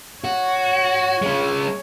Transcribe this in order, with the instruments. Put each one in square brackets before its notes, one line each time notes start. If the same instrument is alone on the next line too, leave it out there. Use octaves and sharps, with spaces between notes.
[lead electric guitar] F#4 [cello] C#5
[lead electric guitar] G#3 C#4